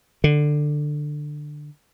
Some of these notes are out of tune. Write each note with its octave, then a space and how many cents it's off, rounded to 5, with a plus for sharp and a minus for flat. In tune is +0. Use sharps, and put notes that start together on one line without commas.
D3 +15